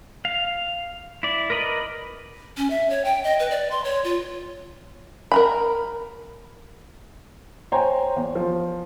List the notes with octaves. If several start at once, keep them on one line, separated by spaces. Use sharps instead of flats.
F5
E4 D5
A#4 B4 D5 D#5 B5
C#4
E5
C#5
G5
D#5
B4
D5
C6
C#5
F4
A#4 A#5 B5
C5 C#5 G5 G#5 A#5
E2
F3